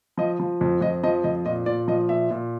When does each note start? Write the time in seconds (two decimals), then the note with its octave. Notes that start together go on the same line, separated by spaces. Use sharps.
0.18 F3 D#5
0.40 F3
0.61 F2
0.81 F2 D#5
1.04 F3 D#5
1.24 F2 D#5
1.45 A#2 D#5
1.66 A#2 D5
1.88 F3 D#5
2.09 A#2 E5
2.31 A#2